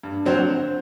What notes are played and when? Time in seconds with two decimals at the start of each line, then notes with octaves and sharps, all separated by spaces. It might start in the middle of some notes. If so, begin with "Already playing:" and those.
0.03 G2
0.26 D3 F#3 C4 F#4